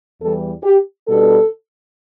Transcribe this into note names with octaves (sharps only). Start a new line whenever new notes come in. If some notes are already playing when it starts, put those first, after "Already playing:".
E2 E3 G3 A4
G4
B2 G3 B3 D4 A4